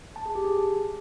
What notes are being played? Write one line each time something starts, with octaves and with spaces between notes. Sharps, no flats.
A5
G#4
G4
G#4